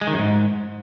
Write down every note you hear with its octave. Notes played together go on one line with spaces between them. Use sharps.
G#3
D#3
F#2
G#2